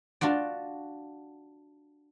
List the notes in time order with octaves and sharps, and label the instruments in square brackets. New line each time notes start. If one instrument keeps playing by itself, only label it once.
[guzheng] D4 F4 F#4 D5